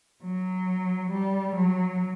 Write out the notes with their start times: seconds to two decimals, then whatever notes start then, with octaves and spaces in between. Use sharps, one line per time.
0.24 F#3
1.11 G3
1.56 F#3